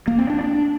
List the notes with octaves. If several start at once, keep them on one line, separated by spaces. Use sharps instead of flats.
A#3
C4
D4
D4